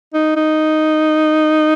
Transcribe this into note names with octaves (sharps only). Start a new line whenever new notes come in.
D#4
D#4